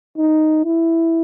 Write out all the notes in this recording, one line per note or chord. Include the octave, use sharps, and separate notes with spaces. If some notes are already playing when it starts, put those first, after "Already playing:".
D#4
E4